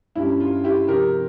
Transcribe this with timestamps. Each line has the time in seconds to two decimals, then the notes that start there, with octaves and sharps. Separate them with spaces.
0.16 G2 G3 C#4 E4
0.40 F4
0.64 E4 G4
0.88 C3 F3 C4 G4 A#4